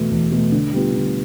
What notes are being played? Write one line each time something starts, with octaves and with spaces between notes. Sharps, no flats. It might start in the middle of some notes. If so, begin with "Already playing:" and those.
Already playing: E2 B2 A3
E2
B2 A3
D3
G3 B3 F4
D3